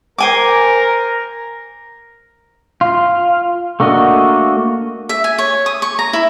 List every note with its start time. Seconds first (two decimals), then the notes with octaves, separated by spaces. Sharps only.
0.18 A#4 C5 G#5 D6
2.81 F4
3.80 A3 A#3 D4 F#4 D#5
5.09 E5
5.24 G#5
5.38 C#5
5.66 D#6
5.82 C#6
5.99 A#5
6.13 E4